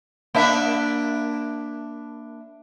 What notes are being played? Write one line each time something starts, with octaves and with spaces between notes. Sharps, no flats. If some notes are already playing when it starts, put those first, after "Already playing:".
A#3 D4 E5